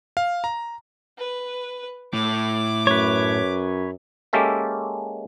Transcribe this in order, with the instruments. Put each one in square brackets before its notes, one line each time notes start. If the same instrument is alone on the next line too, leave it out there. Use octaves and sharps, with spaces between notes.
[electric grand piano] F5
A#5
[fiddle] B4
[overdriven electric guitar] A2 [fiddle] D6
[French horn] F#2 [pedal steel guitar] B4 C#5
[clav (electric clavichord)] G#3 A#3 C#4 G4 A4 E5